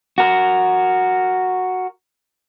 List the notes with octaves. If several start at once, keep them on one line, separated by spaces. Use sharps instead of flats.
F#4 A#4